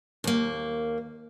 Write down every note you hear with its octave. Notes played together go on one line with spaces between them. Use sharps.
D#2 A#3